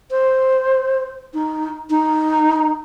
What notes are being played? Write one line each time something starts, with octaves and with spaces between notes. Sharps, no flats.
C5
D#4
D#4